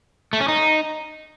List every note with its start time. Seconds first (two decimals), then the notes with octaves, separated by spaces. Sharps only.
0.33 A3
0.41 C#4
0.48 D#4